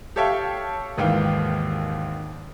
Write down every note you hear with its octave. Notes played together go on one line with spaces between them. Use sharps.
G4 A4 C#5 E5 F5 G5
G#1 D#2 G#2 E3 F5 G5